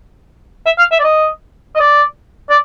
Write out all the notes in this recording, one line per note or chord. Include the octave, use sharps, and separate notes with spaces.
E5
F5
E5
D5
D#5
D#5
D5
D5